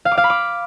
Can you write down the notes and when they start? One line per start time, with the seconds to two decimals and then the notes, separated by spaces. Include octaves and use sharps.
0.05 F5
0.11 D6
0.17 F5
0.24 B5
0.30 D6